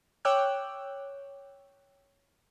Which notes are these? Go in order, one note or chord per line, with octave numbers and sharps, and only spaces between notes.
C#5 G5 D6 E6 F#6